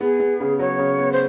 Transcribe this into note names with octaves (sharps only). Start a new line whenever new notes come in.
B3 G#4
B3
C#3
F#3 C#5
C#3
B3
C5